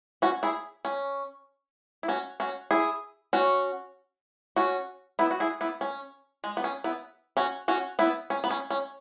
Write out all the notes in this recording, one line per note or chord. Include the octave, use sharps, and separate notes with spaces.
C#4 F#4
E4 G#4
C#4
E4
C#4 F#4
C#4 F#4
E4 G#4
C#4 F#4
C#4 F#4
B3 E4
F#4
E4 G#4
B3 E4
C#4
G#3
B3
C#4
B3 E4
C#4 F#4
C#4 F#4
B3 E4
C#4
B3
C#4
C#4